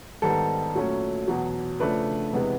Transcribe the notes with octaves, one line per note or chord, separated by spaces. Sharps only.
G#2 D#3 G3 B3 A4
A#2 F#3 A3 C#4
E2 B2 F#3
C#3 F3 A3 D4 B4
E2 C3 E3 G#3 B3